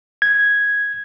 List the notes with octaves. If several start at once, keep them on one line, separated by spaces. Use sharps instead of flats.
G#6